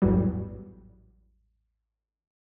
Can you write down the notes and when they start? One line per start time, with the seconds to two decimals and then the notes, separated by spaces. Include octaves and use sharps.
0.02 A1 E2 G#2 E3 F#3 G3